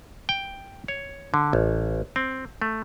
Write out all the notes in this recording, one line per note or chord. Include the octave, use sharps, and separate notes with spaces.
G5
C#5
D3
A1
C4
A3